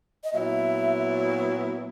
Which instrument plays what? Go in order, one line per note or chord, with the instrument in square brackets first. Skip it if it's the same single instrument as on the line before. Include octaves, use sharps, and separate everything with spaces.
[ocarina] D#5
[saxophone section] A#2 F#3 B3 E4 [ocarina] E5